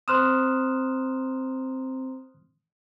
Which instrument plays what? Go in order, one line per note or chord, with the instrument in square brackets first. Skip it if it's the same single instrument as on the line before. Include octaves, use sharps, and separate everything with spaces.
[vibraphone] C4 A#5 [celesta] C5 C6 E7 [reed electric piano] D#6 F6 F#6